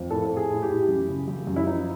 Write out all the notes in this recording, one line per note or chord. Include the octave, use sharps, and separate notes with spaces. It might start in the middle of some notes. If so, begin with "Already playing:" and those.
Already playing: F2
A2 A4
A2
G#4
A2
G4
A2
F#2
C#3
F#2
F#2
E4
F3 D#4